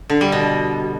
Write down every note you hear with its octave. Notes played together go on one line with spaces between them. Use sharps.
D3
G3
B2